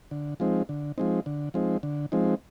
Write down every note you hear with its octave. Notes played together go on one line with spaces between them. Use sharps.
D3
F3 G#3 C4 D#4
D3
F3 G#3 C4 D#4
D3
F3 G#3 C4 D#4
D3
F3 G#3 C4 D#4